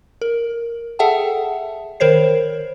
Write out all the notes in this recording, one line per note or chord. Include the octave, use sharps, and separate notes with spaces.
A#4
G#4 A4 E5 F#5 G5 A5
D#3 A#4 C5 C#5 C7